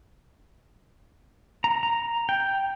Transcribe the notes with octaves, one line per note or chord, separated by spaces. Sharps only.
A#5
A#5
G5